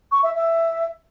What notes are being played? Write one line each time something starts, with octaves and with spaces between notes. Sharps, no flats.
C#6
E5
E5